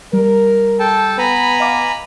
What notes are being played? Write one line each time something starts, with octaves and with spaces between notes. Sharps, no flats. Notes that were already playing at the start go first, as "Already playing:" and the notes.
G3 A#4
A4 G5 A5
B3 G#5 A#5 B5
D#5 F5 D6